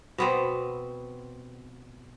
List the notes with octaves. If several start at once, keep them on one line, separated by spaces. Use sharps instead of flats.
B2 B3 C4